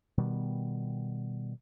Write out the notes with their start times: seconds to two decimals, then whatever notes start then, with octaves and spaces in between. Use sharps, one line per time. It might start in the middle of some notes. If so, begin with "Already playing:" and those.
0.18 B2 D#3 G3 B3